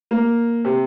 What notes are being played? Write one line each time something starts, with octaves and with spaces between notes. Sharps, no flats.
A#3
C3